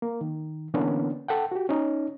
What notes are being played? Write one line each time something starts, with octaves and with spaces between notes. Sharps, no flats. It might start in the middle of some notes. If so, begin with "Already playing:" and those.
A#3
D#3
D3 E3 A#3 B3 C#4 D4
A4 F#5 G5
F#4 G4
C#4 D#4